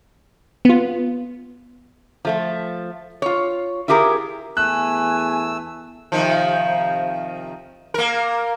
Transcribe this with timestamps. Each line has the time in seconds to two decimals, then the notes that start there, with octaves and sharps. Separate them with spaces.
0.65 B3 F4
2.25 F3 A3 F4
3.22 F4 C#5
3.88 E4 F4 G4 G#4 A#4
4.57 E2 A3 G#5 E6 F#6
6.12 C3 D#3 F3
7.94 A#3 A#4